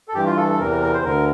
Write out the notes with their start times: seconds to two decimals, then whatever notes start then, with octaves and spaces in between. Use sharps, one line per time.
0.08 A4
0.14 G2 E3 G4
0.26 F4
0.37 A4
0.48 A4
0.59 E2 C3 E3 A#4
0.71 A#4
0.82 A#4
0.94 C5
1.04 D2 D3 A#4